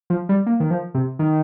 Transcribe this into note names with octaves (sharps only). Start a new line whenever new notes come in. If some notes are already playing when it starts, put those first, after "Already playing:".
F3
G3
A#3
D#3
F3
C3
D#3